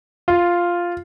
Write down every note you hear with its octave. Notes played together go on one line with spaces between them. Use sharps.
F4